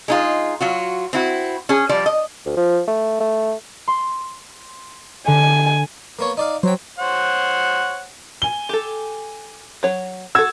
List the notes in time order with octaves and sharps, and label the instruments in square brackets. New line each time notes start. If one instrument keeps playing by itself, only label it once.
[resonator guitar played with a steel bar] G#3 D#4 F4
F#3 F4 F#4
C4 E4 F#4
C#4 G#4
F3 G3 D5
D#5
[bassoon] D2
F3
A3
A3
[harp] C6
[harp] D3 [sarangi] G#5
[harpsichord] A#3 B3 C#5
D#4 D5 F5
[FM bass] F#3 [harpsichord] C5 G5
[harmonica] C5 C#5 F#5
[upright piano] G#5 G7
[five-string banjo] G4 A4
F#3 C#5
[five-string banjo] F#4 A4 [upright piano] E6 G#6